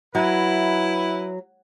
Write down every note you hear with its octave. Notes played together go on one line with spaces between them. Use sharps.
F#3 E4 B4 E5